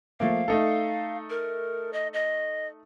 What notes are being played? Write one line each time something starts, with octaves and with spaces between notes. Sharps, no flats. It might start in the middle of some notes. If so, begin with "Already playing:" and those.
F3 A3 A#3 F5
A3 D#4 A4
A#4
D#5
D#5